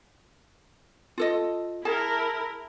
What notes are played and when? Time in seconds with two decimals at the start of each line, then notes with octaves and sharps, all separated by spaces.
1.18 F4 A4 D#5
1.85 E4 G#4 A#4 A5